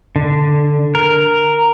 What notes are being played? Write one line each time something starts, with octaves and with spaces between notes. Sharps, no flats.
D3
A#4